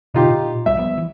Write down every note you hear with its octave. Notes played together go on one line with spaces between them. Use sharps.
B2 D3 D#4 F4 G4
A#2
B1 G3 A#3 E5
F3 G3 B3
E3